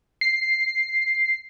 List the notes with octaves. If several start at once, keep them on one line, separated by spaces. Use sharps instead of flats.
C7